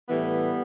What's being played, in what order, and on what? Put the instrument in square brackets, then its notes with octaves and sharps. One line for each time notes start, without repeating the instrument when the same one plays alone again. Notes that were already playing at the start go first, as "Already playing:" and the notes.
[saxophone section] A2 E3 G3 B3